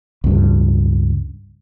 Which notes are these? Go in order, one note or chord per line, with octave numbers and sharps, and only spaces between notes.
C#2 G2